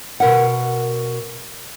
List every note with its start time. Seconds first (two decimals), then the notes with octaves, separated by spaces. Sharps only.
0.20 B2 A#4 F#5